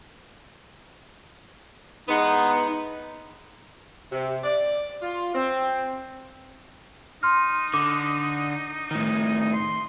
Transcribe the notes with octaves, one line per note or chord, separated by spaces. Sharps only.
E2 G#3 B3 D#4
C3
D5
F4
C4
D#4 C6 F6
D3 D6
A2 D#3
C6